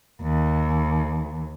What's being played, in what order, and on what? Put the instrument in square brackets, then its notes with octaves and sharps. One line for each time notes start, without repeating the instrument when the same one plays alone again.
[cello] D#2